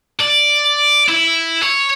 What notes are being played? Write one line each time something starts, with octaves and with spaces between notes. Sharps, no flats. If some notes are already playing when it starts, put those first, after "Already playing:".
D5
E4
C#5